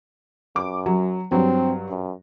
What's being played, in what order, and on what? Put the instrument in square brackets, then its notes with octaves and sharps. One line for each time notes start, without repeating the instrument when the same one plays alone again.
[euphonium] F#2 [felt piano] D6
[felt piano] F#3
[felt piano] G2 F#3 [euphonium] C4
[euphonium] F#2